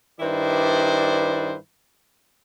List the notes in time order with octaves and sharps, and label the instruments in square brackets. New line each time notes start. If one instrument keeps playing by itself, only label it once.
[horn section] G2 D#3 E4 B4 C5 D5